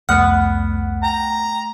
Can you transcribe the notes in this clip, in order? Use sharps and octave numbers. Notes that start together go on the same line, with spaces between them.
C2 F2 A3 B3 F#5 F6 F#6
G5 A#5